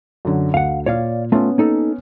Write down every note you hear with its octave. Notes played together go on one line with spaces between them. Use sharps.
F#2 D3
D2 F5 F#5
A#2 C#5 D5 F5
A3 B3 C#4 F4
A#3 D#4 A4